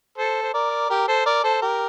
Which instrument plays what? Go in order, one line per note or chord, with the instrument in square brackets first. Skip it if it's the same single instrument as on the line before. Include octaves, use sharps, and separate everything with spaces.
[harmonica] A4 C5
C5
A#4 D5
G4 A#4
A4 C5
A#4 D5
A4 C5
G4 A#4